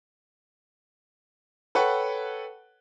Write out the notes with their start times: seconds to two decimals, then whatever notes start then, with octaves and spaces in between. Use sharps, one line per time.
1.75 A4 B4 C#5 F#5 G5 C#6